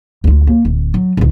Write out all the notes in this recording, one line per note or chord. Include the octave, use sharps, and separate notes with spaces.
D2 F4
A#3
D1
F#3
C#2 A2